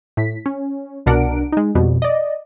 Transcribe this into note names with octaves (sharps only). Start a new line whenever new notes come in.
A2 B6
C#4
C2 B2 D4 A#4 F#5 D7
G#3 D#4
F2 B2 G3
D5 D#5